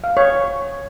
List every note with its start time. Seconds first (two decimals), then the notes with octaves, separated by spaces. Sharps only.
0.04 F5
0.17 C#5